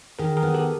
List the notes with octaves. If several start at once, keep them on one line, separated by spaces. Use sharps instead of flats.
D#3 G#4 A#4
G#4 A#4
B3
G4 A4